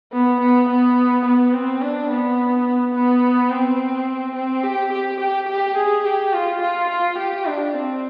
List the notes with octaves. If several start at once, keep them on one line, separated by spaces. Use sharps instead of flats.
B3
B3
B3
B3
C4
D4
B3
B3
C4
C4
G4
G4
G4
G4
G#4
G4
F4
F4
F4
G4
D4
C4